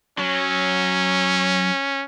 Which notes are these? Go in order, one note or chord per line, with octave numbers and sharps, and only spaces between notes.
F#3 C#4